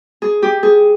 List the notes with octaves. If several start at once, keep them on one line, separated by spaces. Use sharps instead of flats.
G#4
G4
G#4